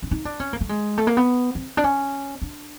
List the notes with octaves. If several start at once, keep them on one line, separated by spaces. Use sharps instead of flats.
D4
D#4
D4
C#4
A#3
A3
G#3
A3
A#3
B3
C4
D4
C#4
D4